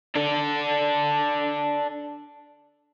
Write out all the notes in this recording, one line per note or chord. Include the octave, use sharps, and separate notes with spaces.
D4 A4